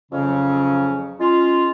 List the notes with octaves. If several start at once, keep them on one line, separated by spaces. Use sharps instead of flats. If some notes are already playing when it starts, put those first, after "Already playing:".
F2 C#3 F#3 C#4
G#3 C#4 F4